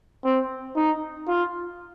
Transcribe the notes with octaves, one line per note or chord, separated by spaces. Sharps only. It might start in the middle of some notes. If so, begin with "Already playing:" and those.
C4
D#4
F4